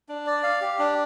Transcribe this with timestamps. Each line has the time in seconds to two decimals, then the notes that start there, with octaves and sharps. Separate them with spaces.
0.09 D4
0.27 D5
0.43 F5
0.61 G4
0.79 D4